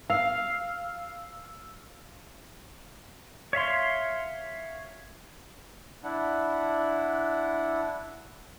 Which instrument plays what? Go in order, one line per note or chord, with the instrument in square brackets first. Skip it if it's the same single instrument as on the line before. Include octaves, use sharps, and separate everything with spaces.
[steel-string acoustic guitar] F5 [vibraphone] E6
[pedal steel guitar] C#5 E5 F5 C6
[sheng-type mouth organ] D4 E4 F#5